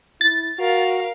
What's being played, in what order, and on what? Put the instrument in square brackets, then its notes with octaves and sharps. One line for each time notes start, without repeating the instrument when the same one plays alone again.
[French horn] E4 [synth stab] A6
[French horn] F#4 [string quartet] A#4 F5